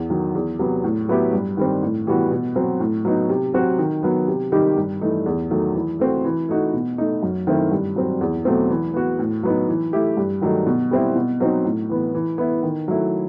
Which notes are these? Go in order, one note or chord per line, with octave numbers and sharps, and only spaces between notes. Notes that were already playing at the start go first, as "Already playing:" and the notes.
Already playing: E2
D#3 F#3
E2
C3 F#3 B3
A2
F#3 B3 E4 G4
G2
D#3 G3 C4
A2
E3 G3 B3 F#4
B2
F#3 C4
A2
F#3 B3 D#4
C3
F#3 C4 F#4
D#3
F#3 B3
C3
D#3 G3 D#4 G4
G2
E3 A3 D#4
E2
D#3 F#3 A3
E3
A3 C4 F#4
E3
A3 D#4 F#4
B2
A3 D#4
F#2
D#3 A3 C4 E4
G2
F#3 C4
E2
B2 F#3 A3 C4
E3
B3 F#4
A2
F#3 B3 D#4
E3
A3 E4 G4
G2
D#3 F#3 A3 D#4
B2
G3 C4 E4
B2
F#3 C4 D#4
A2
E3 B3
E3
B3 E4
D#3
F#3 A3 E4